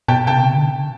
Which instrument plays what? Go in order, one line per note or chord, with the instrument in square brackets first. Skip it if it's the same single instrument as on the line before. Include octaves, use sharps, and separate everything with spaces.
[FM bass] B2 [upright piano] G5 A5
[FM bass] C3 [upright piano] G5 A5
[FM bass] C#3
D3
C#3